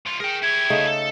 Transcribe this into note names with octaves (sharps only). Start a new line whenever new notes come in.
A2 F4
G#4 A#4 G5
E4 G4 G#6
C#3 A3 D#4
A4